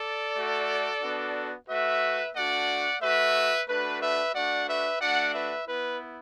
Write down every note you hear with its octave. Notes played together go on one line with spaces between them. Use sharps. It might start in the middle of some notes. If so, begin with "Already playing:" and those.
Already playing: A4 D5
A3 F#4
B3 D4 F#4
A3 F#4 B4 E5
A3 D4 F#4 D5 F#5
A3 F#4 B4 E5
A3 D4 F#4 B4
B4 E5
A3 D4 F#4 D5 F#5
B4 E5
A3 D4 F#4 D5 F#5
B4 E5
B3 E4 B4